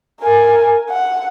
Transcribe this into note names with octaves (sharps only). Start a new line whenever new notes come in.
A#4 G#5
F#5